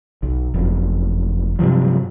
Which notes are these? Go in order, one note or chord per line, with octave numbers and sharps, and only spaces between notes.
B1
F#1 F2
G2 C3 F3 F#3